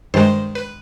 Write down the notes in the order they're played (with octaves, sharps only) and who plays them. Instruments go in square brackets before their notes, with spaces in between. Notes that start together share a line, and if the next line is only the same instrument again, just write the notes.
[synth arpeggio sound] G2 D#3 G#3 C5
B4